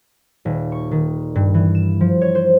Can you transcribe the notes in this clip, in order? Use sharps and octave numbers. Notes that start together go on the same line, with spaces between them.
D#1
C#6
D#3
G2
E3
E7
F3
C#5
C5